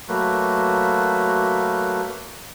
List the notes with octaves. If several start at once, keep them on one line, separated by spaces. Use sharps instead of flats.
F#3 A3 A#3 B4